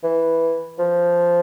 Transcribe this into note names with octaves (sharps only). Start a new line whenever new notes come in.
E3
F3